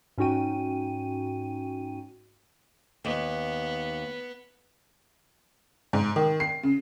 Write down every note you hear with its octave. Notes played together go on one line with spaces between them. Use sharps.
G#2 C#4 D#4 F#4 G5 D#7
D#2 B3
G#2
D#3
C7
C#3